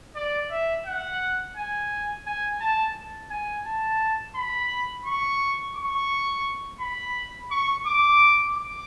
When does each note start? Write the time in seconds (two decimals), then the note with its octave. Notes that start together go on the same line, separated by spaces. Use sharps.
0.15 D5
0.50 E5
0.86 F#5
1.56 G#5
2.26 G#5
2.61 A5
3.30 G#5
3.66 A5
4.35 B5
5.05 C#6
5.76 C#6
6.80 B5
7.51 C#6
7.86 D6
8.56 D6